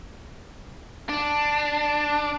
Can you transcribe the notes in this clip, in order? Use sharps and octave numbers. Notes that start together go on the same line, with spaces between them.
D4